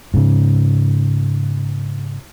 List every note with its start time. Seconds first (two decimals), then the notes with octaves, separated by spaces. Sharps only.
0.14 G#2 C#3